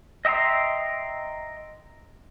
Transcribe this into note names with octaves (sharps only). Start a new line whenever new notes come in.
D#5 E5 G5 A#5 C6